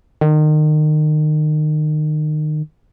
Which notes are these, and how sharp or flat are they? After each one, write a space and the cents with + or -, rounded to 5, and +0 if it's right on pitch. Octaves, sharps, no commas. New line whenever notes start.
D#3 -30